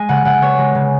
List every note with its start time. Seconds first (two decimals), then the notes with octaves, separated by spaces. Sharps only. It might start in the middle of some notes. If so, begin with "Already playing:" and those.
Already playing: G#3 G#5
0.09 C#3 F#5
0.25 C#3 F#5
0.42 B3 C#5
0.58 G#3
0.75 C#3